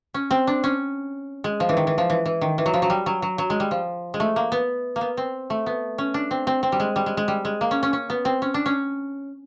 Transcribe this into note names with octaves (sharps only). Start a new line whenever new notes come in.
C#4
C4
D4
C#4
G#3
F3
E3
D#3
E3
F3
E3
E3
D#3
E3
F#3
F3
F#3
G3
F#3
F#3
F#3
G#3
G3
F3
G#3
A3
A#3
B3
A#3
B3
C4
A3
B3
C#4
D4
C4
C4
C4
G3
G#3
G3
G#3
G#3
G3
G#3
A#3
C#4
C#4
C#4
B3
C4
C#4
D4
C#4